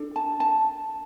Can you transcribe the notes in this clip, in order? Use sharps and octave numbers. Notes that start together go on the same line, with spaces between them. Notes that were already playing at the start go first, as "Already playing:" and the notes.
Already playing: D4 A4
A5
A5